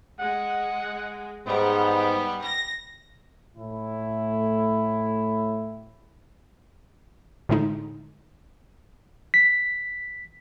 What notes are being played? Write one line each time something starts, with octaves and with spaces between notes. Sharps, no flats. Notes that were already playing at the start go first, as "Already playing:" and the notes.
G#3 F#5
G#2 G3 B3
A#6
A2 E4
A2 D3 G#3 D#4
B6